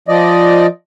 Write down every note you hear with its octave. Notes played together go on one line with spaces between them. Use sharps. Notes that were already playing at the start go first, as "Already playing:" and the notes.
F3 D5 D#5